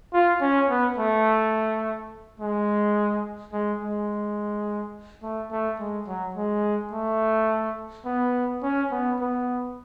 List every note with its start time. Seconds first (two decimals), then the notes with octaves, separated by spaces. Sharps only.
0.13 F4
0.41 C#4
0.69 B3
0.98 A3
2.40 G#3
3.53 G#3
3.81 G#3
5.23 A3
5.51 A3
5.79 G#3
6.08 F#3
6.36 G#3
6.92 A3
8.05 B3
8.63 C#4
8.91 B3
9.20 B3